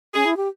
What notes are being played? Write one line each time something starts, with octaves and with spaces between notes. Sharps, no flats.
C#4 G#4
E4
G4